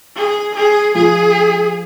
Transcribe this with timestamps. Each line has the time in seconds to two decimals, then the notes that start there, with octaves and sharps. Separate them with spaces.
0.16 G#4
0.55 G#4
0.95 F3 G#4